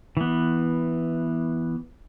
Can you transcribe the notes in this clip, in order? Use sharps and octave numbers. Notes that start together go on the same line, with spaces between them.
E3 B3